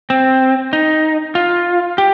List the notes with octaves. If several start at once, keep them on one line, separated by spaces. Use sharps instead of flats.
C4
D#4
F4
G4